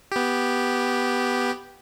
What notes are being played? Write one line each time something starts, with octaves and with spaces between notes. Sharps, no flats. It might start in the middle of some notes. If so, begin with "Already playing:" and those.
B3 G4